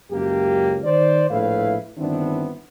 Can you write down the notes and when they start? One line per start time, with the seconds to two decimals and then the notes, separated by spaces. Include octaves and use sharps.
0.11 C#2 F#2 A#3 G4
0.85 D#3 C5 D5
1.31 A#1 A2 E4 B4 F5
1.98 G1 D#3 B3 C4 D4 E4